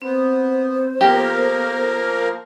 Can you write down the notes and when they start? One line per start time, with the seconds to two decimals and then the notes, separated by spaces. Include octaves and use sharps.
0.02 B3 C4 C5 B5
1.01 F3 A#3 B3 G4 A4 A#4